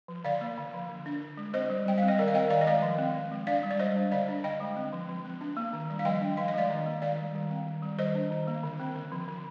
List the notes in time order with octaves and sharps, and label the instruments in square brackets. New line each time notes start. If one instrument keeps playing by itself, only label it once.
[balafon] F3
D3 D5 F5
A#3
D3
F3
D3
D4
D3
G#3
C4 C5 D#5
G3
G3 G5
C4 F5
D#5
D#3 A#4 D5
F5
C4 D#5 G5
D#3 D5 F5
D#5
G#3 D5 F5
F3
C4
F3
G#3
D4 D5 F5
G3
D5
G3 C5 D#5
D4
D3 D5 F5
D4
D3 D#5 G5
G#3
C4
F3
F3
C4
D4
A#3
D#3
G3
F5
F3 D#5 G5
D4
F3 F5
D#5
G#3 D5 F5
D#3
A#3
D#3 D5 F5
G3
D#3
C4
D#3
G3
D#3 C5 D#5
D4
D#3
A#3
D3
C4
D3
F3
D3